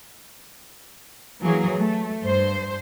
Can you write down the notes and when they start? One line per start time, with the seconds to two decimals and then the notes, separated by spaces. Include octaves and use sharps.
1.43 E3 F#3 A#3 G#4
1.78 A3
2.25 G2 C5